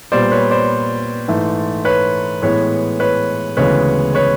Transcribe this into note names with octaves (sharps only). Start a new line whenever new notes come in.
A#2 G3 B3 C5 D5
B4 C#5
C5 D5
G#2 E3 A3
B4 C#5
A2 E3 G#3 B3 B4 C#5
B4 C#5
D2 C#3 E3 G#3 B3 B4 C#5
B4 C#5